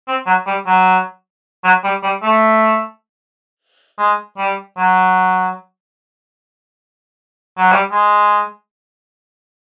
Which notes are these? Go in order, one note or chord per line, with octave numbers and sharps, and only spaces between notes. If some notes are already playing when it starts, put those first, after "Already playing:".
C4
F#3
G3
F#3
F#3
G3
G3
A3
G#3
G3
F#3
F#3
G3
G#3